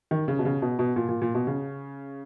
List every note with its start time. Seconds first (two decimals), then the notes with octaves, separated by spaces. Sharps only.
0.11 D#3
0.28 C#3
0.39 B2
0.45 C#3
0.62 B2
0.79 B2
0.96 A#2
1.09 A#2
1.22 A#2
1.35 B2
1.47 C#3